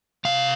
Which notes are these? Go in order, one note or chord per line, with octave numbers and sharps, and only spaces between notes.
C3 F5